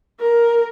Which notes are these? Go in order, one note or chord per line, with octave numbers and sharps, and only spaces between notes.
A#4